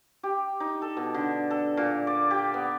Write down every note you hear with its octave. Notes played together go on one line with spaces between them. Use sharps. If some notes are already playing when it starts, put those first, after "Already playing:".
G4
D#4
A4
B2
D3
A4
A#2
D5
G4
B3